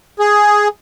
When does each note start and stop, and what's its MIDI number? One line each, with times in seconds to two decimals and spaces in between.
0.20 0.68 68